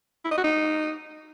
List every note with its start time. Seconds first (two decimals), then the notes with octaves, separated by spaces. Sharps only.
0.25 E4
0.31 D#5
0.38 F#4
0.44 D#4